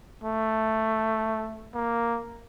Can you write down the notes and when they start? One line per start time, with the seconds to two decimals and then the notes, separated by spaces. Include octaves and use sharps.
0.24 A3
1.74 A#3